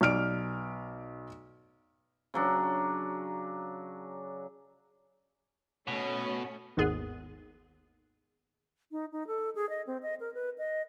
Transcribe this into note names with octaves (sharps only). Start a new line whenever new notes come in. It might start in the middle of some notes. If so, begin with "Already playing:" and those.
B1 D5 F6 D7
C#3 F#3 D4
B2 A3 C#4
G#1 D#2 G#2 B3 G#4
D#4
D#4
A4
G#4
D#5
C4
D#5
A#4
B4
D#5